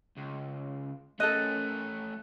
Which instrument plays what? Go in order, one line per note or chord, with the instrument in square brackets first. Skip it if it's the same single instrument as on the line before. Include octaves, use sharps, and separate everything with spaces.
[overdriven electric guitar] C#2
[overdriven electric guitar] A3 C#4 [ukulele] A4 A#4 D#5 [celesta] F#6 D#7